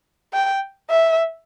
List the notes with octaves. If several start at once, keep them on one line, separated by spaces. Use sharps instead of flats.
G5
E5